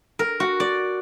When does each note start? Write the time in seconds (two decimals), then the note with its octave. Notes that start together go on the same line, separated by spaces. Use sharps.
0.19 A#4
0.40 F#4
0.60 D5